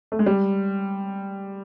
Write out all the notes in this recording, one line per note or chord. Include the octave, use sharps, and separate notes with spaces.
A3
G#3
G3